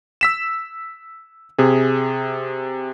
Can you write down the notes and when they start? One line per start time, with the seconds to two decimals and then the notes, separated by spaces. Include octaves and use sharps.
0.21 E6 B6 E7
1.58 C3 G#4